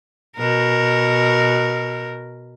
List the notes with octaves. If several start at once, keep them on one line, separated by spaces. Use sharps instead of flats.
B2 A#4